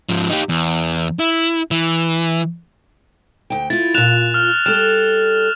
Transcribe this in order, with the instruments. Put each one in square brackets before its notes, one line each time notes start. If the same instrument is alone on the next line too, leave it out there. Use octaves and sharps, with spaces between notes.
[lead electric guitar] G#2 F3
D#4 G4
E2
E4
E3
[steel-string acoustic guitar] D2 G5
[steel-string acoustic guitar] E4 F4 [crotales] A6
[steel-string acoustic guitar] A#2 F4 [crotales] F#6 E7 F7
[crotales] F6
[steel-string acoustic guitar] G3 A4 [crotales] F6 E7